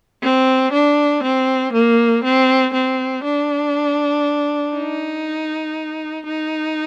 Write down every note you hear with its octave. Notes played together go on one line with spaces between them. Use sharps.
C4
D4
C4
A#3
C4
C4
D4
D#4
D#4